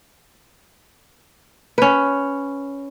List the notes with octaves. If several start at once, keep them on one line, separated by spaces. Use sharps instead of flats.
C#4 B4